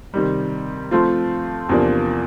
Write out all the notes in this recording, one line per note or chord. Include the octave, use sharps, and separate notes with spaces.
C3 D#3 G3
F3 A3 C4 F4
E2 C3 F3 A#3 D4